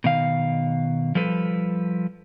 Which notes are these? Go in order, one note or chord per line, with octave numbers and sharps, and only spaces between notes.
B2 D#3 F5
F3 G3 A4 B4